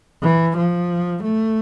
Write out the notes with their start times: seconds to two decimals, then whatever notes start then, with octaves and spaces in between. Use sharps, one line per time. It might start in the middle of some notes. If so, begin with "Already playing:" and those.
0.22 E3
0.57 F3
1.23 A3